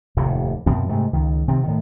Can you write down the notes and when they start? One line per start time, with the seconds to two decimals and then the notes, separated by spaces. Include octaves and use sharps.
0.17 F1 D#2 A2 C3
0.66 F#2 B2 F3 C4
0.89 G#2 C3 A3
1.13 C#2 D#3
1.48 C3 D#3 C4
1.63 A2 D#3